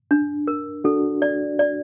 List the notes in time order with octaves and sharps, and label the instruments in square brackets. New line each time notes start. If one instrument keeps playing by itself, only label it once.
[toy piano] D4
A#4
[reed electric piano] D4 F#4 [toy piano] A4
[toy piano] D5
D5